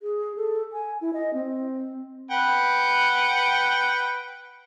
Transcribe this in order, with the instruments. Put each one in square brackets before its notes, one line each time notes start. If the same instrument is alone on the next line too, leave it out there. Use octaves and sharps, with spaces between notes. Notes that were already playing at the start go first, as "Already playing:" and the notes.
[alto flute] G#4
A4
G#5
E4
D#5
C4
[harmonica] B4 F#5 G5